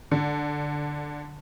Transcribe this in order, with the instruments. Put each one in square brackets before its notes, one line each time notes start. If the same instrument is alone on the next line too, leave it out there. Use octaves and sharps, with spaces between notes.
[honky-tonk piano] D3